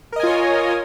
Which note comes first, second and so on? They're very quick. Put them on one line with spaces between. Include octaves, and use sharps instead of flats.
A#4 D#5 G#5 F4 C#5